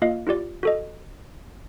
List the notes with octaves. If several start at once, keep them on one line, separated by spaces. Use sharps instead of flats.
A#3 F4 D#5 F5
E4 F4 G4 D5
F#4 A4 D#5